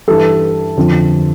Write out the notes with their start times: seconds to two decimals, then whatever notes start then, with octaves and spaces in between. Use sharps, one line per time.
0.07 G2 E3 G3 A4
0.77 F2 D3 F3